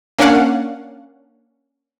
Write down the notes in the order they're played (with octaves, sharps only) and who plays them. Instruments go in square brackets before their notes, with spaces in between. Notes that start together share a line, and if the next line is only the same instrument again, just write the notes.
[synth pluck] A#3 C#4 D4 F5 F#5